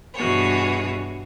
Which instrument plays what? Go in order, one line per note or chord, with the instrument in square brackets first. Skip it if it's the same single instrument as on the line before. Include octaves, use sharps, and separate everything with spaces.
[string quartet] G2 B2 E3 F#4 G#4 C#5